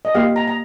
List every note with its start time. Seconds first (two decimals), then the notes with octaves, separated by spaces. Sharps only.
0.05 D#5
0.15 A#3 G4 F5
0.36 A#5
0.47 A#5